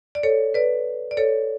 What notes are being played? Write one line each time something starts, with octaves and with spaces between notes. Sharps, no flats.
D5
A4 C#5
B4 D5
D5
A4 C#5